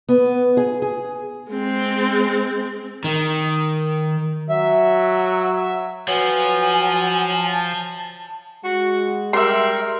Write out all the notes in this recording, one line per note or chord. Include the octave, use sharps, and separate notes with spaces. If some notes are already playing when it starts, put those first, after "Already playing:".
B3
G#4
G#4
G#3 C4
D#3
F#3 E5
F3 F#3 B4 G#5
A5
G#3 F#4
G3 A#4 E5 C6